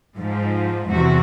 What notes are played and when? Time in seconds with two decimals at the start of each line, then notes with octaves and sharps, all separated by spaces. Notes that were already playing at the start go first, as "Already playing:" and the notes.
0.18 G#2 F3
0.92 E2 C3 F#4